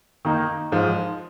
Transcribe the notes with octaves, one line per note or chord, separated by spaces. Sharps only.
D#3 A#3 D#4
G#2 F3 G#3